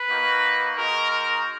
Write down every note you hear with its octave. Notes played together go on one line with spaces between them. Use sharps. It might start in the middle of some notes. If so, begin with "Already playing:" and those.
Already playing: B4
A#3 D#4 F#4
G#3 D#4 F#4 A#4
A#4